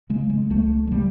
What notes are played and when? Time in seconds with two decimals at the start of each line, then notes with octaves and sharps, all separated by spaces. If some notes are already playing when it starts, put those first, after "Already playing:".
0.10 C#3 G#3
0.30 G#3
0.50 C#2 A3
0.87 G#3
0.91 C#3 G3